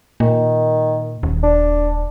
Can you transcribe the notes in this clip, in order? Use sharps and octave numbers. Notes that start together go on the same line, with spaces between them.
A#2 D#3
D#1
D4